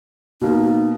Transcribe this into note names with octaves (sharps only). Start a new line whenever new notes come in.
B2 A#3 D#4